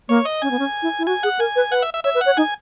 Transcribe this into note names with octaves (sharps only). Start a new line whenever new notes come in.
A#3 C#5
D#5
C#4 G#5
B3
C#4
E4
E4
F#4 G#5
G#4 F#5
A#4 G#5
B4
B4 F#5
E5
E5
C#5 E5
B4
C#5 F#5
D#4 G#5